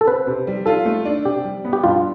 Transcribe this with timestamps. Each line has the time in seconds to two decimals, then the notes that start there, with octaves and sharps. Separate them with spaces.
0.01 A4
0.07 C4 B4
0.27 C3
0.47 G3
0.66 F4 A4
0.85 A3
1.05 D4
1.25 C3 G4
1.44 G3
1.65 B3
1.73 G4
1.83 G2 F4